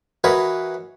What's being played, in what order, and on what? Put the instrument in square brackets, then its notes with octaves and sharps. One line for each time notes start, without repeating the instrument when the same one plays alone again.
[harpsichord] E3 F#4 A#4 B4 C#5 D#5